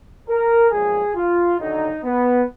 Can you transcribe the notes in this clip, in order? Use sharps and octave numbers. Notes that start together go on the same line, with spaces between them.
A#4
B1 A#2 F3 G#3 G#4
F4
D#2 D3 F#3 D#4
B3